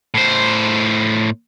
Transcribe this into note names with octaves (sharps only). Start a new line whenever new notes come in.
A2 C5